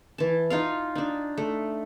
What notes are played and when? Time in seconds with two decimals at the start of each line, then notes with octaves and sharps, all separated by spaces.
0.18 E3 A5
0.50 D#4 F4 F5
0.95 D4 D#4
1.38 A3